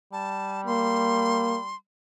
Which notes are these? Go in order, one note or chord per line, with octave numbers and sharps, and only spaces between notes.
G3 A5
A#3 C6